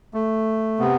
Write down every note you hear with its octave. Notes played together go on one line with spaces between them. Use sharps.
A3
C3 B3